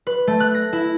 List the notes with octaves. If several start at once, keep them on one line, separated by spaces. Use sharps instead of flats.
B4
A3
F#6
A#6
E4